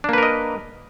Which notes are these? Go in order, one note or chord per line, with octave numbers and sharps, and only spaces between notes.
A#3 D4 A#4 B4 D#5